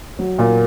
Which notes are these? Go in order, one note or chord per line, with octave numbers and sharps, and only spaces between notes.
F#3
A#2